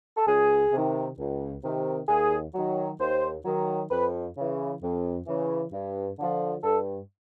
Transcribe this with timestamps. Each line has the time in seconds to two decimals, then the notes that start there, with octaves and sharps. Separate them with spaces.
0.17 A4
0.27 C#2 G#4
0.73 C3 D#3
1.18 C#2
1.64 C3 D#3
2.09 D#2 G#4
2.54 D#3 F#3
3.00 D#2 C5
3.45 D#3 F#3
3.91 F2 B4
4.37 C#3 E3
4.82 F2
5.27 C#3 E3
5.73 G2
6.19 D3 F3
6.63 G2 A4